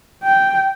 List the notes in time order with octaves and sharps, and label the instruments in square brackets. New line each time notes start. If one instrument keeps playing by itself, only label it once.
[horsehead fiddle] G5